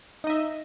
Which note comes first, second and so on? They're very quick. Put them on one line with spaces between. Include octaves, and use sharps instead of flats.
D#4 D#5 E5